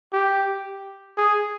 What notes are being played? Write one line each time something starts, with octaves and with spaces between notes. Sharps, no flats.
G4
G#4